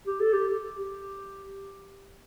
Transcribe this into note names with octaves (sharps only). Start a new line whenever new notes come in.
G4
A4
G4
G4